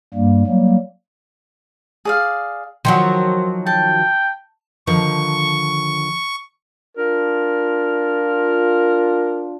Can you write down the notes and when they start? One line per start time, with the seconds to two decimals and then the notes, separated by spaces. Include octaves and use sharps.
0.14 G2 G3 A#3
0.47 F#3 G3 A#3
2.05 G#4 D5 F5
2.85 D#3 F3 F#3 F#4 C5
3.66 G5 A5
4.87 D3 D#3 F3 C#6
6.97 D4 F4 A#4